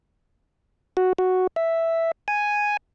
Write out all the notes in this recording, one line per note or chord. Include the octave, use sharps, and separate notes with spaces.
F#4
F#4
E5
G#5